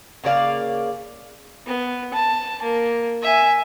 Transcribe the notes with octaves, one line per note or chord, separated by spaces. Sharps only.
C#3 A#3 D5 F5
B3
A5
A#3
E5 G#5